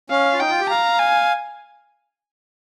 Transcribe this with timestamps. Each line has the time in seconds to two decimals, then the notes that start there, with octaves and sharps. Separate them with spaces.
0.10 C#4 F5
0.34 F4
0.40 D#4 G5
0.50 F4
0.60 G4
0.70 F5 A#5
0.99 G#5